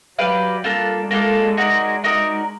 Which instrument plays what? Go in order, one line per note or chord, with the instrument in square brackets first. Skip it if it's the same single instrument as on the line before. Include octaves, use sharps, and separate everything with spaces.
[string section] F#3 [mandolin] G4 B4 D5 F5
[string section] G3 [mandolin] A#3 D4 F4 A4
[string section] G#3 [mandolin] A#3 D4 F4 A4
[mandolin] D#4 F#4 A#4 D5
D#4 F#4 A#4 D5